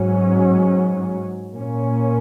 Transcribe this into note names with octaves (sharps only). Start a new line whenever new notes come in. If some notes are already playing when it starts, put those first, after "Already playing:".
Already playing: G#2 F#3 C#4
A#2 A#3 C#4